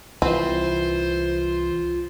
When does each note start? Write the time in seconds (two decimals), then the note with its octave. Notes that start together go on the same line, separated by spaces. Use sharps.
0.22 C2 E3 C4 F4 B4 C5